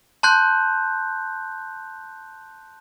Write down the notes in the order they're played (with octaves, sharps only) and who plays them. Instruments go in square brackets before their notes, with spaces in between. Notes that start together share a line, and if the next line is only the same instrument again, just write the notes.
[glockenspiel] A5 C6 F#6 G6